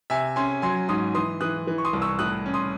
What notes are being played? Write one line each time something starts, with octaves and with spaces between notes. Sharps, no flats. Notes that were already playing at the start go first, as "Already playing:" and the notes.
C3 E5 G#5
C#4 G#5 C6
F#3 G#5 C6
G#2 C6 D#6
E3 C6 D#6
E3 D#6 F#6
E3
C#6
C6 D#6
C2
C#6 E6
A2 D#6 F#6
C#4
C6 D#6